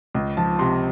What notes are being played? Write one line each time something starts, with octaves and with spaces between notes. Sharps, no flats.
C#2
F3 A5
C3 C6